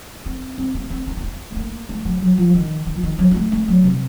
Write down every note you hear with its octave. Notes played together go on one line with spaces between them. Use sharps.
C4
C4
A#3
C4
C4
C#4
C4
A3
A#3
A3
F#3
F#3
F3
D#3
D#3
F3
D#3
F#3
F#3
A3
A3
F#3
C3